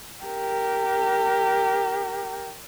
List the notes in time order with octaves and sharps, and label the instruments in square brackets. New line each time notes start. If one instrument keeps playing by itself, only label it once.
[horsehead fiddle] G4 A#4